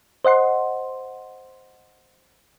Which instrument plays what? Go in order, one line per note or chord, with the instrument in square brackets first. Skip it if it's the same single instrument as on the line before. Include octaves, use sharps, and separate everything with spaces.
[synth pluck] C5 D#5 F#5 C6